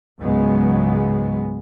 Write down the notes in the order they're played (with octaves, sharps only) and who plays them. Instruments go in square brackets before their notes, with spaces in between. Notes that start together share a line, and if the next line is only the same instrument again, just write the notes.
[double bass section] C#2 G#2 C#3 F#3 G#3 B3